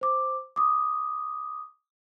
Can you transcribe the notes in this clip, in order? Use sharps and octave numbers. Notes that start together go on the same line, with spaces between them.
C5 D6
D6 D#6